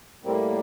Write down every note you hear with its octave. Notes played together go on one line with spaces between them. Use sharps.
A2 G3 A#3 C4